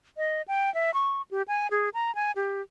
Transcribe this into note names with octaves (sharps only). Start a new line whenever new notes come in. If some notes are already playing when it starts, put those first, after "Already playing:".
D#5
G5
E5
C#6
G4
G#5
G#4
A#5
G#5
G4